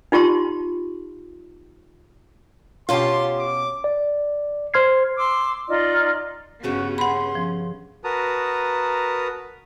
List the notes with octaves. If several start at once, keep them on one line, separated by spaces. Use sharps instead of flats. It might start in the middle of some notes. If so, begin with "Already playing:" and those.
D#4 F4 G4 A5 C6
B2 C#4 F4 G4 A5 C6
D6
D5
C5 C6 F6 G#6 C7
C6 D6 E6
D#4 F4 D5 D#5
G2 C#3 B3 C#4 F#4 B4
F#5 B5 C6
F3
F#4 A#4 B4 A5 A#5 D#6